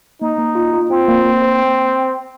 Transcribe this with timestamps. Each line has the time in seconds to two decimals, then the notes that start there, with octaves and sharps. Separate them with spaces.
0.21 A#3 D#4
0.38 A#3
0.55 F4
0.73 F4
0.90 C4 F4
1.08 A#3
1.24 A#3
1.42 C5